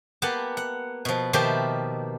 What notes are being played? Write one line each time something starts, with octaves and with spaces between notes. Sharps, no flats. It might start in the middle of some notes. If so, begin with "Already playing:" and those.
A#3 B3 G4 F#5 A5
F#5
B2 F3
B2 D#3 F3 A#3 G4 E5